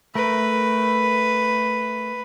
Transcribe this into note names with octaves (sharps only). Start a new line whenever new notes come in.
A3 A#4 B4